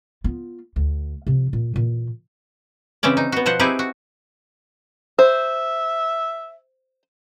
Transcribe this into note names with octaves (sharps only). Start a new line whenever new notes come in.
B3 F4
D2
C3 F3
A#2
A#2 E3
C#3 E3 C4 C#4 D5
D#4
B3 F#4
B2 F3 C5 F#5
C4 D#4 E4 G4 G#4 B4
F#4
C5 E5